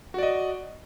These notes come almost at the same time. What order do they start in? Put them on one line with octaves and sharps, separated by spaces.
F#4 D5 D#5